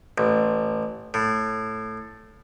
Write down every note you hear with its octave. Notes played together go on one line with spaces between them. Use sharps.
A1
A2